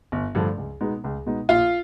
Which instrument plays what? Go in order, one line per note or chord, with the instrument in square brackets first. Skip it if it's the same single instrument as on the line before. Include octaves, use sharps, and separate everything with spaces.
[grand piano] G1
G2 D3 F3 A3
C#2
B2 G#3 B3 D#4
C#2
B2 G#3 B3 D#4
[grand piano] A#1 [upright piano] F4